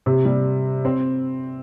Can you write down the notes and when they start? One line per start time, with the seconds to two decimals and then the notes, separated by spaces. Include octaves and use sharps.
0.06 C3
0.25 G3
0.85 C4